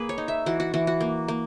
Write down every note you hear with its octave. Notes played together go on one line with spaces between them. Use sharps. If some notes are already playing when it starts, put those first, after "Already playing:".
Already playing: A#3 G#4 B4
C#5
D#4
E5
E3 F#4
F#4
E3 F#4
F#4
A#3
A#3